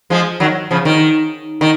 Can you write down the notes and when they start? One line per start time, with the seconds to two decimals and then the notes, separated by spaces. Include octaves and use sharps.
0.10 F3 G#3
0.40 D#3 F#3
0.71 C#3 F3
0.85 D#3
1.61 D#3